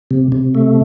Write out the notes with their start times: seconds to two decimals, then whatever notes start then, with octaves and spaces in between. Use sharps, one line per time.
0.11 C3
0.32 C3
0.55 A3